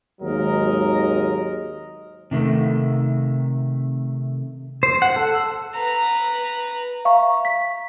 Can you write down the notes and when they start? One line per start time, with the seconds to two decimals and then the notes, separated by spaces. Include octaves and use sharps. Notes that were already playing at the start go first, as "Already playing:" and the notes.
0.22 G#1 D#2 F#3 G#3 A#4 D#5
2.31 C3 D#3 A3
4.83 C5
5.02 F#5
5.16 A4
5.74 B4 A#5
7.05 E5 F5 A#5 C#6
7.45 B6